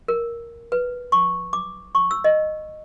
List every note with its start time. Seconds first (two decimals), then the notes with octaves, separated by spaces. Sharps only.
0.08 A#4
0.72 B4
1.12 C#6
1.53 D6
1.95 C#6
2.11 E6
2.24 D#5